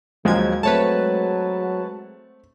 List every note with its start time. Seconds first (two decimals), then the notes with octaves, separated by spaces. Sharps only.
0.25 D#2 D#3 F3 F#3 G#3 G#6
0.63 F#3 A3 C4 B4 C#5 A5